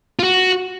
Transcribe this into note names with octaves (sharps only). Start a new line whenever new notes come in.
F4
F#4